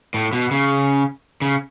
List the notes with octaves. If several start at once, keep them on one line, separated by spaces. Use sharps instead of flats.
A2
B2
C#3
C#3